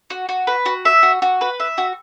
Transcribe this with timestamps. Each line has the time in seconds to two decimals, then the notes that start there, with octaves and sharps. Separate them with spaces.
0.10 F#4
0.29 F#4
0.47 B4
0.66 F#4
0.85 E5
1.03 F#4
1.22 F#4
1.41 B4
1.60 E5
1.78 F#4